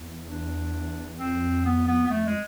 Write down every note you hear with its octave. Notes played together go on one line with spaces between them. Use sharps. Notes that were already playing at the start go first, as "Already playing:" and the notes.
Already playing: E2
D4
F2 C4
B3
B3
B3
F2 A3
G#3